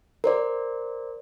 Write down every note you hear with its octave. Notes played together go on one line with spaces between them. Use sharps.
A#4 C5 D5